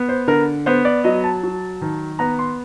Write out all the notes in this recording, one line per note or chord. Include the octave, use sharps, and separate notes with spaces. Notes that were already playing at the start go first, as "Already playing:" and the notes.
Already playing: B3
C5
D3 A#4
B3 C5
D5
F#3 D#5
A5
F#3
D#3
B3 A#5
C6